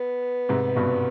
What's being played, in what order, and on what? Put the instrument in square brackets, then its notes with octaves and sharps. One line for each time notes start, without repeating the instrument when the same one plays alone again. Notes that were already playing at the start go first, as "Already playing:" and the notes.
Already playing: [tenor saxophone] B3
[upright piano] G#2 C3
G2 B2